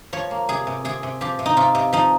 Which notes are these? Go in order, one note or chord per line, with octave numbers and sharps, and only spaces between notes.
F3 C#5
A#3
C3 G#4
C3
C3 G#4
C3
F3 G4
C3
D#4
C3 F4
C3
F3 D#4